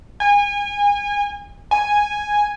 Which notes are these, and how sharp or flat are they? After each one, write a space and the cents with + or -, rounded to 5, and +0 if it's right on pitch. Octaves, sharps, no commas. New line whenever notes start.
G#5 -30
G#5 -5